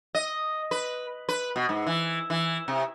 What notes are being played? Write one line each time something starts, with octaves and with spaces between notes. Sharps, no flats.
D#5
B4
B4
B2
G#2
E3
E3
C3